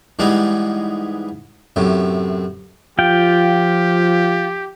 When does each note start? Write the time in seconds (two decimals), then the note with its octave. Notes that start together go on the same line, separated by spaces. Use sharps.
0.19 G#2 E3 G3 G#3 B3 D#4
1.76 F#2 A2 C3
2.99 F3 F4 G4 G5